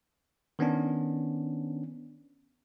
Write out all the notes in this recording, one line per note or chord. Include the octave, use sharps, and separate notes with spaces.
D#3 B3 C#4 D4